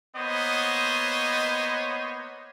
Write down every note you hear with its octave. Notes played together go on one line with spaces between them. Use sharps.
A#3 B3 C5 C#5 D#5